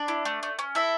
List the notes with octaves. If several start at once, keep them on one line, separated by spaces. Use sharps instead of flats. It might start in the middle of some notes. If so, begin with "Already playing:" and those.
Already playing: D4 D5
E4
A3
A3
C#4
E4 A4 E5